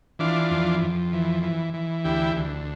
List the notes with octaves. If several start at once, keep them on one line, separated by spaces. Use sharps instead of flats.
E3 D4 F4
F2
F2
E3
E3
E3
D2 E4 G4
D2